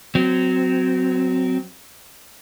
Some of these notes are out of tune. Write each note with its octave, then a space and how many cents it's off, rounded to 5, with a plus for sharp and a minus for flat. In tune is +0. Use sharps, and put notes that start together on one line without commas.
F#3 +0 C4 -20